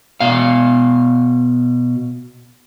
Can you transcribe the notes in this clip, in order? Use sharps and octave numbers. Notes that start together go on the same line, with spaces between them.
B2 F5